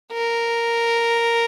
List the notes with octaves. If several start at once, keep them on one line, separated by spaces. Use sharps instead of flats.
A#4